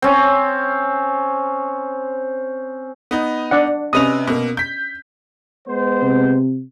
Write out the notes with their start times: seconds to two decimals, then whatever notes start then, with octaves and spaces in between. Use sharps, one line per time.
0.02 C4 C#4
3.11 B3 D#4
3.51 D4 D5 F#5
3.93 C3 C#4 B4 D#5 D#6 F7
4.28 B2 A#3
4.57 G6 B6
5.67 G#3 B3 C5
6.02 C3